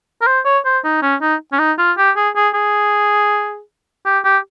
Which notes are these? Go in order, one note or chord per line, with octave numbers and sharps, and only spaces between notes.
A#4
C5
C#5
C5
D#4
C#4
D#4
C#4
D#4
F4
G4
G#4
G#4
G#4
G4
G4